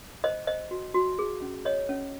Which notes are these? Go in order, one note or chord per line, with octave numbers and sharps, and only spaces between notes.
C5 D#5
C5 D#5
F#4
F#4
G#4
C#4
C#5 D#5
C#4